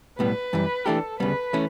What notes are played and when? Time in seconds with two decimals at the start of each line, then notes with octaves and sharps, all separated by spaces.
0.19 B1 A2 G3 B3 B4
0.53 F#2 E3 G3
0.86 E3 A3 D4 G4 A4
1.20 D2 C#3 G3 B3 B4
1.53 E3 A3 C#4